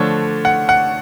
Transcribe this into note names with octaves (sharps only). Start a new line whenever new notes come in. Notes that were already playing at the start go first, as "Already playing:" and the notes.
Already playing: D3 F3 A3 D4 C#5
F#5
F#5